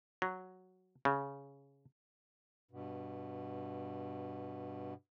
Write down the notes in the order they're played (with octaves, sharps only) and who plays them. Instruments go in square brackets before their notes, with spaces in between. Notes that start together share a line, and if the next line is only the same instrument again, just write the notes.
[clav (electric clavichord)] F#3
C#3
[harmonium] G2 B2